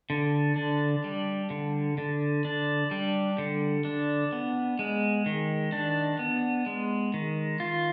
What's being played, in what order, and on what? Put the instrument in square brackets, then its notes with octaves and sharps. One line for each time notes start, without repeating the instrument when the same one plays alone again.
[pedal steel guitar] D3
D4
G3
D3
D3
D4
G3
D3
D4
B3
G#3
D#3
D4
B3
G#3
D#3
F4